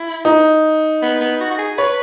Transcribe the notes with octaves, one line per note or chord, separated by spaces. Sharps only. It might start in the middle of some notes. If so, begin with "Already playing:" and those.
Already playing: E4
D#4
B3
B3
F#4
F#4
G#4
B4 C#5